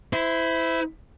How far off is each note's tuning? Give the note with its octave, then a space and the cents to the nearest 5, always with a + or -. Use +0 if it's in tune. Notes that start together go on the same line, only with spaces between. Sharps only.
E4 +0 C5 -30